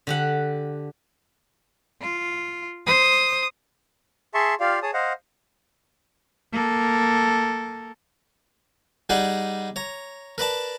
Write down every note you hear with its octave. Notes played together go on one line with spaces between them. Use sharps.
D3 G4 F#5
F4
C5 D#6
G#4 E5 A5 C6 C#6
F4 G4 D5 F5
G#4 C#5 A5 D#6
C5 D#5 F5 F#5
A#3 A4
G3 D#4 G#4 D5 F#5
C#5 A#5
A#4 B4 D5 A5